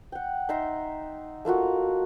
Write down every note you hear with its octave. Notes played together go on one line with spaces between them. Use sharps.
F#5 G5
D#4 E5 A#5 C6
A3 A#3 F4 F#4